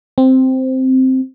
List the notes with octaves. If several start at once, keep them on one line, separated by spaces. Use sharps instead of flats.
C4